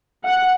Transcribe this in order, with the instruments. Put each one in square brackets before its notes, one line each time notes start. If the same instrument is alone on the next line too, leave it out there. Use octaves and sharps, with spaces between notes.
[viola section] F#5